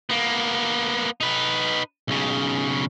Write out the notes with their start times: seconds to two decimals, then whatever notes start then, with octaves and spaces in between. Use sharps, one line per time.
0.10 A#3 B3
1.21 D#4 B4
2.08 B1 C#3